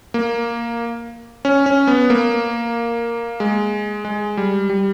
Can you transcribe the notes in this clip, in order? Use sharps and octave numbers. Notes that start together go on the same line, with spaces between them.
A#3
C#4
C#4
B3
A#3
G#3
G#3
G3
G3